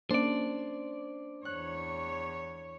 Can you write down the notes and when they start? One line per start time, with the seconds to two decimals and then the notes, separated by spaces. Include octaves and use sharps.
0.11 A#3 C#4 D4 C5 D5
1.45 E2 C#5 F#6